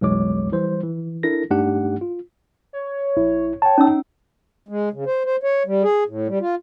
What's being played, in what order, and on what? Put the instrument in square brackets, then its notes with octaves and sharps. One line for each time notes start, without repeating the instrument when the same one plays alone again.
[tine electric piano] B1 F2 E3 G#3 C#5 D6
E3 G3 C5
E3
D4 E4 A4 A#4 A#6
G2 A3 D4 D#4 G4 F#5
F4
[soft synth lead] C#5
[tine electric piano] A#1 E4
[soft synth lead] C#5 [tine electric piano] G5 A5
[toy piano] C#4 C#5 E6 [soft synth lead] D#4
[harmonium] G#3
C#3
C5
C5
C#5
G3
G#4
A2
G3
F4